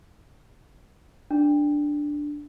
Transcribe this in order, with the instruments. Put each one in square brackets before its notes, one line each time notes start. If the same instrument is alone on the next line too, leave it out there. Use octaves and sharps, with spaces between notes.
[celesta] D4